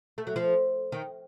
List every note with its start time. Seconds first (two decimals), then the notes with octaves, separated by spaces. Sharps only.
0.18 A3
0.27 F#3
0.36 F3
0.92 D#3